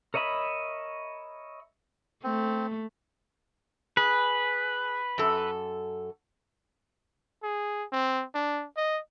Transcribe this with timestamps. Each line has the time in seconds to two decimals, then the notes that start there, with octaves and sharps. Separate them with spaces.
0.14 A#4 C#5 D#5 E5 B5
2.24 A3 C4
3.97 G#4 B4
5.18 F#2 A4
7.43 G#4
7.93 C4
8.35 D4
8.77 D#5